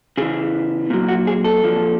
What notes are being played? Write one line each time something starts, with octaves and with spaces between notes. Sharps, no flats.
C#3 E3 G#4
A#2 F#3
F#4
G#4
A4
A#2 F3